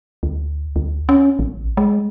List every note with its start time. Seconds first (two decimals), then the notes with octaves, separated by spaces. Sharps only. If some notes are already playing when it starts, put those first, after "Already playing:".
0.23 D2
0.76 D2
1.09 C#4
1.39 A1
1.77 G#3